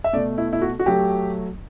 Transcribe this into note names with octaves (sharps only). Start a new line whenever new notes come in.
E5
B2 A3 D5
E4
E4
F#4
F#4
F#3 A3 G4